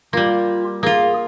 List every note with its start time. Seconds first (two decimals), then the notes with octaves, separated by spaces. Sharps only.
0.13 G3 A#3 F4
0.83 A#3 F4 G#4